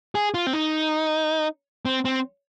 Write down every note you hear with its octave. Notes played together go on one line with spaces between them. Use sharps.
G#4
F4
C4
D#4
C4
C4